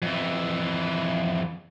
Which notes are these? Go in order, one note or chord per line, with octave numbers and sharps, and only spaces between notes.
F2 E3